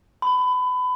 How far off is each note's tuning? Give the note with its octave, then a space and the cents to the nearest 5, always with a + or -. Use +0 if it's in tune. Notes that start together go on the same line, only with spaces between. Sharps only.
B5 +25